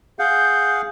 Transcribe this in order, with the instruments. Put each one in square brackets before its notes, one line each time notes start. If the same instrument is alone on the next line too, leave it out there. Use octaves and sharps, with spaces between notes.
[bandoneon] G#4 F5 F#5 [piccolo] G6